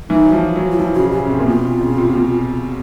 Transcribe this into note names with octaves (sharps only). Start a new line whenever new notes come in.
E3 D#4
F#3
F3
F#3
F4
F3 E4
C#3 F#4
C#3 G4
C#3
C3
A#2
B2 F4
C3
C#3
C3
B2